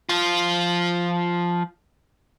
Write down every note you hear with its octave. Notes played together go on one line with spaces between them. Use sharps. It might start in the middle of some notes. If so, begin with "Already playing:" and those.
F3 F4